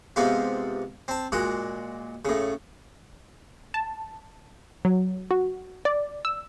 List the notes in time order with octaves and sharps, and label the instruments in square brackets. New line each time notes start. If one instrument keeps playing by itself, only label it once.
[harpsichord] G#2 C3 B3 F4
C4 A5
A#2 G#3 F#4
A2 C#3
[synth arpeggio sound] A5
F#3
F#4
D5
E6